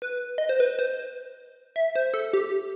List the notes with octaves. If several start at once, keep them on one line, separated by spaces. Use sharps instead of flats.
B4
D#5
C5
B4
C5
E5
C5
A4
G4